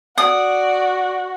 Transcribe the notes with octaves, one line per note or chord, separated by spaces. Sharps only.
F#4 D5 D#6